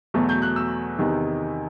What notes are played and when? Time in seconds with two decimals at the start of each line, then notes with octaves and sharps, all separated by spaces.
0.14 E2 B2 F#3 A3
0.29 G6
0.42 F#6
0.56 E6
0.98 E2 C3 D#3